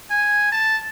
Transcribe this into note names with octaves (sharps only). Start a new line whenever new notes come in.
G#5
A5